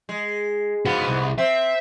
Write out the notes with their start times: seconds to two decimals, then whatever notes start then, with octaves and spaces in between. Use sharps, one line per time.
0.09 G#3
0.86 G#2 B3 F#4 F5
1.08 C2
1.38 C4 E5